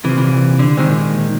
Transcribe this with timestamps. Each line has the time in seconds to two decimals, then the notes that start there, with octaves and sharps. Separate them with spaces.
0.05 C3 E3 F3
0.17 A#2 E3
0.59 D3
0.77 D#3 G#3 C4
0.89 A#2